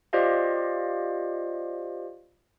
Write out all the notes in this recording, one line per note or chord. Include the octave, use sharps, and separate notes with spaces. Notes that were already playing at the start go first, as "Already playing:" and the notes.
F4 G4 C5 D5 D#5 F5